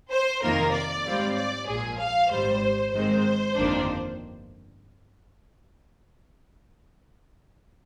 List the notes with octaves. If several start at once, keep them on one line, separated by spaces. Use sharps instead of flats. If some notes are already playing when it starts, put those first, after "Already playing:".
C5
F2 C3 D#3 A#3 F4 A#4
D5
G#2 G3 C4 F4
D5
A#1 A#2 F3 A#3 G#4
F5
G#1 G#2 G3 C5
G#2 D#3 G#3 C4 C5
G1 F2 D#3 A#3 D4